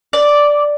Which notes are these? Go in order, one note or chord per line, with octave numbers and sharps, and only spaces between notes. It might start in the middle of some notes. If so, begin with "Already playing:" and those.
D5